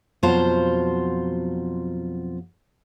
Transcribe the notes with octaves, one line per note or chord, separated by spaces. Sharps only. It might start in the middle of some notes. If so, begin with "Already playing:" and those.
F2 B2 F#3 F4 C5 A5